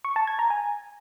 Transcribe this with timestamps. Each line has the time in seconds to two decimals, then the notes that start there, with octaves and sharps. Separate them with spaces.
0.05 C#6
0.16 A5
0.27 G#6
0.39 A#5
0.50 G#5